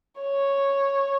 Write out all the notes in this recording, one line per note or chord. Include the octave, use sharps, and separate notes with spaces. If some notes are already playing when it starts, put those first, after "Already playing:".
C#5